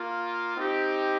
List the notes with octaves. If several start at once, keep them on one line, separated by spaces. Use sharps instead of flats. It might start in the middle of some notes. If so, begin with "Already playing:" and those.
Already playing: A#3 F4
C4 D#4 G4